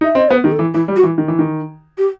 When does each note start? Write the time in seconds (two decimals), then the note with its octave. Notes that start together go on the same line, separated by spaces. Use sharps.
0.01 D#4
0.04 E5
0.15 C4 D#5
0.29 B3 C5
0.44 D#3 G4
0.52 A4
0.59 E3
0.74 E3 E4
0.88 G3
0.96 F#4
1.03 E3
1.18 D#3
1.28 E3
1.39 D#3
1.98 G4